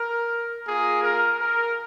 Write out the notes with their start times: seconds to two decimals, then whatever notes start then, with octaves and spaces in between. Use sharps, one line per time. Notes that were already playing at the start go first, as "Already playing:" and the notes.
Already playing: A#4
0.68 A#3 F4 G#4
1.04 A#4
1.40 A#4